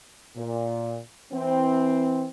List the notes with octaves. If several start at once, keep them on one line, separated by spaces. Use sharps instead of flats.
A#2
E3 C4